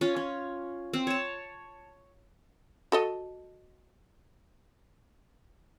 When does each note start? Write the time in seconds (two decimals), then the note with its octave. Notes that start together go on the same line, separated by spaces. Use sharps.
0.01 C#4 F4
0.16 C#4
0.93 C4
1.07 C#5 A5
2.92 F#4 A4 D#5